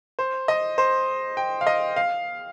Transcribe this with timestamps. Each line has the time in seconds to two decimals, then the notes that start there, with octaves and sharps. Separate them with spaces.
0.19 C5
0.48 D#5
0.78 C5
1.37 G5
1.61 F5
1.67 D#5
1.96 F5